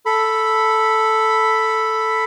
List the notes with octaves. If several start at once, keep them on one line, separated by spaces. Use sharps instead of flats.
A4 B5